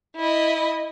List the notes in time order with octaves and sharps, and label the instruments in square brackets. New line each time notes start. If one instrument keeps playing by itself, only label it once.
[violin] E4 D#5